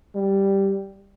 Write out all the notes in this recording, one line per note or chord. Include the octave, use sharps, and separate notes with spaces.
G3